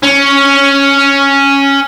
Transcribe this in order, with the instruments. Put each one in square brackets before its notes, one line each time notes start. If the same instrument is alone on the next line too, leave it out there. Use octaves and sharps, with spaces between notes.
[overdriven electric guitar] C#4